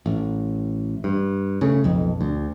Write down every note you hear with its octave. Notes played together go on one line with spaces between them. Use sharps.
A1
G2
C#3 A3
B1 F2
D2